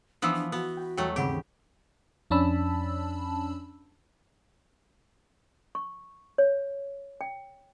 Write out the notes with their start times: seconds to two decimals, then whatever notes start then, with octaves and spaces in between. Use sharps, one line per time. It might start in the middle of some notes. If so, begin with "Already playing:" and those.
0.22 E3 F3 B3 D4 D#6 E6
0.34 D4
0.52 B3 F#4
0.77 G5 B5
0.98 E2 F#3 G3 A3 D#5 G5
1.16 D#2 G#2 C#3 C4 G4 G#4 F#5 B5
2.30 F2 C#4 D4 A5 B5 E6
5.75 C#6
6.38 C#5
7.21 G5